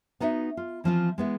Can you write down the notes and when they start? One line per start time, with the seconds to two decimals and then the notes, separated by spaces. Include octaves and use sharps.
0.20 B3 D#4 F#4 D#5 E5
0.57 F4
0.84 E3 F3 C4 F4
1.18 G#3 B3 E4